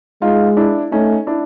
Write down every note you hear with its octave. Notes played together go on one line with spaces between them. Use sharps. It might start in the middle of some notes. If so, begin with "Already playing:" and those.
G#3 D#4 F4
D4 E4
A3 C#4 D#4
D4 E4